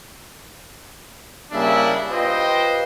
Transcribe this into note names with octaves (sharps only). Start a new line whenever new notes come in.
C#3 G3 A#3 D4 E4 E5
F4 G4 B4 C5 D#5 G5